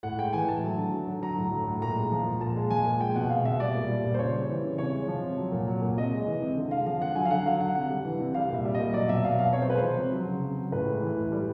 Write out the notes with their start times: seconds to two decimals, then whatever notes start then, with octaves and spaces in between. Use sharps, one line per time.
0.03 A2 F#5
0.18 G#3 G5
0.33 E3 G#5
0.48 A2 A5
0.63 F#3
0.78 D3
0.92 F#3
1.07 D3
1.22 F#3 A#5
1.37 A2
1.52 F#3
1.67 A2
1.81 A#2 A#5
1.96 G#3
2.12 F3
2.26 A#2
2.40 A#2 A5
2.56 G#3
2.70 F3 G#5
2.86 A#2
3.00 G#3 G5
3.16 B2 F#5
3.30 G#3 F5
3.45 B2 E5
3.60 G3 D5
3.75 A#2
3.89 G3
4.04 A#2
4.14 C5
4.19 C#3 C#5
4.34 G3
4.49 E3
4.64 C#3
4.78 C3 C#5
4.94 G#3
5.08 F3
5.23 C3
5.38 F#3
5.52 A#2
5.67 F#3
5.82 A#2
5.97 C3 D#5
6.12 G#3
6.27 E3
6.42 C3
6.57 D3
6.71 G#3 F5
6.86 F3 F5
7.01 D3 F#5
7.15 F#3 G#5
7.25 F5
7.31 D3 F#5
7.46 F#3 F5
7.60 D3 F#5
7.75 C3 F#5
7.90 G3
8.05 E3
8.20 C3
8.34 G3 F5
8.50 A#2 E5
8.65 G3
8.75 D#5
8.80 A#2
8.94 F#3 D5
9.09 B2 E5
9.24 F#3 F5
9.39 B2 F5
9.53 C3 C#5
9.62 C5
9.69 G#3 B4
9.78 C5
9.84 F3
9.98 C3
10.13 F#3
10.28 C#3
10.43 F#3
10.57 C#3
10.72 A2 B4
10.87 G#3
11.02 E3
11.17 A2
11.32 G3